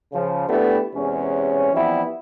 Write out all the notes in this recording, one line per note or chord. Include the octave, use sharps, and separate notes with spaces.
C#3 F3
A3 B3 D4 E4 G4
E2 C3 G#3 C#4
E3 F3 G3 B3 C4 E4